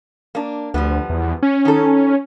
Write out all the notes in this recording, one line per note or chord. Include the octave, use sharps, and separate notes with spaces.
A#3 D4
D2 F3 G3 B3
E2
C#4
D#3 A4